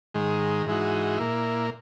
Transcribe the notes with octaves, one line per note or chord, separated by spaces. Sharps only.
G#2 D#3 G#3
G#2 E3 G#3 D#4 F#4
A#2 A#3 E4